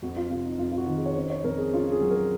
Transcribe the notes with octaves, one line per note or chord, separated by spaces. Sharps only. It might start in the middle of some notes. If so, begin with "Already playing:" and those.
F2 F#4
F4
C3 F4
D#4
F2 F4
F4
F#4
D#3
G#4
C#5
C#4 C5
C#5
F2 A#4
G#4
C#4 F4
G#4
F#3
A#4